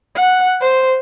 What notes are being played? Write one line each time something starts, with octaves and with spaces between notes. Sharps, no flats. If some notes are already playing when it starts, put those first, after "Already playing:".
F#5
C5